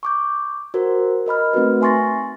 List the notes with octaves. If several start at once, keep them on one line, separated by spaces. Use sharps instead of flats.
C#6 D6 G6
F#4 A#4 C5
A#4 D#5 B5 F6
A3 C4 D#4 F#4 B4
E5 G#5 C6 C#6 A6 A#6